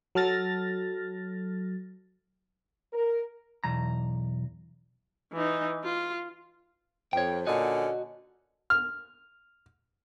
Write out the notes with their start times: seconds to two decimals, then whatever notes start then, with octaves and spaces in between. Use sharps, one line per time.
0.15 F#3 A4 F6 A6 A#6
2.93 A#4
3.64 B1 E2 A#5
5.33 E3 D#4
5.84 F4
7.13 F2 C#5 G5
7.47 A#2 D3 C#4 F#4 D#5
8.70 F6